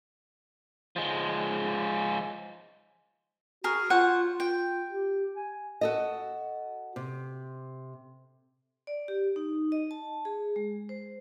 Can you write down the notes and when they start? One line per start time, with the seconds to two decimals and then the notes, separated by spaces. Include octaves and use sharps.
0.96 F3 G#3
3.64 F#4 G#4 A#4
3.90 F4 C5 C#5 F#5
4.40 F4 G5
4.89 G4
5.36 G#5
5.81 F#4 A4 D#5
6.96 C3
8.87 D5
9.08 G4
9.36 D#4
9.72 D#5
9.91 A5
10.25 G#4
10.56 G#3
10.89 C5